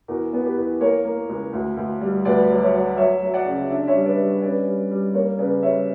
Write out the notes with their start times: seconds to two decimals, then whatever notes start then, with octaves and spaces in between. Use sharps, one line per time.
0.08 E2 F#4 A#4
0.33 B3
0.44 G4 B4
0.57 E2
0.80 A#3 A#4 C#5
1.05 A#3
1.29 C#2
1.53 D2
1.77 D2
2.01 G3
2.25 D2 B4 D5
2.50 F#3
2.62 C#5 E5
2.74 F#3
2.97 F#3 C#5 E5
3.22 F#3
3.34 D5 F#5
3.46 C#3
3.70 D4 E5
3.79 D5
3.87 C#5 E5
3.93 G3
4.06 B4 D5
4.18 G3
4.42 C#4 B4 D5
4.66 G3
4.91 G3
5.14 A#3 A#4 C#5
5.38 C#3 B4 D5
5.63 G3 C#5 E5